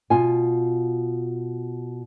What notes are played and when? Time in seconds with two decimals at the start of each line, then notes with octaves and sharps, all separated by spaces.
0.10 B2 F4 G#5